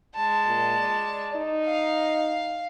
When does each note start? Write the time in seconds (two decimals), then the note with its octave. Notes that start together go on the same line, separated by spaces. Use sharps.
0.15 G#3 A5
0.47 A#2
0.78 D5
1.35 D#4
1.65 F5